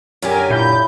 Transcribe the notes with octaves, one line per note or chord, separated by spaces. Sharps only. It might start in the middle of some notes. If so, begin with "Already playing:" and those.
F#2 D3 F#3 G4 A#4 G#5
A#2 E4 G6